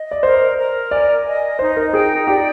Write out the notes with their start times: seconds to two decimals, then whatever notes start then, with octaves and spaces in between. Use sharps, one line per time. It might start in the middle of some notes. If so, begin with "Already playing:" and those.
Already playing: D#5
0.11 D5
0.23 A#4 C5
0.58 A#4
0.91 D5 G#5
1.26 D#5
1.59 D#4 C5
1.77 A#4
1.93 G#4 G5
2.27 G4 D5